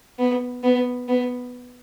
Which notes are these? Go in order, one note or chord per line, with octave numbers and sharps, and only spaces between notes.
B3
B3
B3